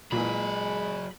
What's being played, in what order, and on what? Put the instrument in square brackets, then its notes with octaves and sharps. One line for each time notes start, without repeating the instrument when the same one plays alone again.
[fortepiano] A#2 E3 [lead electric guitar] F#3 G#4 [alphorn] G#3 [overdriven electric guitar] B5